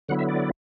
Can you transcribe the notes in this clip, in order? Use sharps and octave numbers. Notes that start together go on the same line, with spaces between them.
D3 F#3 B3 E4 F#5
E5
D5